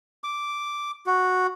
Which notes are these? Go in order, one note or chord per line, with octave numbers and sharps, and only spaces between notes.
D6
F#4